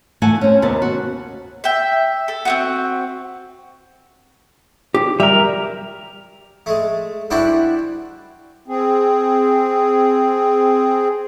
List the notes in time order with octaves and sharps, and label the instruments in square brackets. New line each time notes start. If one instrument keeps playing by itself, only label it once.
[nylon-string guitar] E3 A3 F#5 G#5 A5
C4 C#4
D#2 C3 B3 A5
F#4
[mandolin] E5 G5
A4
C4 D#4 F#4
[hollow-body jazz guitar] G4
[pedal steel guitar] G3 A#4 [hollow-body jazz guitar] E5
[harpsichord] G#3 A3
G3 D4 E4 F#4 C5
[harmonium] C4 G#4